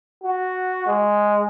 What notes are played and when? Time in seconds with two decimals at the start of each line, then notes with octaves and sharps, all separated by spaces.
0.24 F#4
0.87 G#3